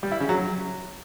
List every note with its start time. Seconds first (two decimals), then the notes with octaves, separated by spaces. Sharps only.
0.03 G3
0.12 E4
0.20 C#3
0.29 F#3